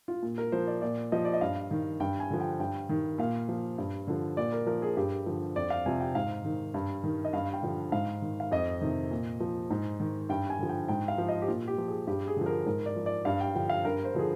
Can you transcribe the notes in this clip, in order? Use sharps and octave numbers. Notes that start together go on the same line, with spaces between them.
F4
A#2
A#4
F3 C5
D5
A#2 D5
F3 D#5
D5
D#5
G2 F5
D#3
G2 G5
G#5
D3 F3
G5
G2 G5
D#3
A#2 F5
F3
G2
D3 F3
A#2 D5
A#4
F3 A#4
G#4
G2 G4
D3 F3
F2 D5
F5
C3 F3 G#5
G5
G#2 F5
D#3
G2
D#3
D#5
G2 F5
G5
D3 F3
G#2 F5
D#3
F5
F2 D#5
C3 D#3
A#2
F3
G#2
D#3
G2 G5
G#5
D3 F3
G5
G#2 G5
F5
F3
D#5
G4
A#2 F4
G4
F3
G#4
G2 G4
G#4
D3 F3
A#4
G#2 A#4
D5
F3
D5
G2 F5
G5
D3 F3 G5
F5
G2 A#4
C5
D3 F3 G#4